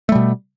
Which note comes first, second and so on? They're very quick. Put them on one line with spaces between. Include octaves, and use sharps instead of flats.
A3 G3 B2